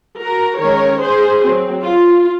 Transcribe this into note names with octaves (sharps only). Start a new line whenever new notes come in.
F#4 A#4
D#3 G#3 C#4 A#4 C#5
G#4 C5
F#3 C4
F4